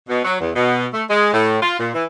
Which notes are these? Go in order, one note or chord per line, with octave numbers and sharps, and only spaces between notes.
B2
F#3
E2
B2
A3
G#3
A2
F4
A#2
E3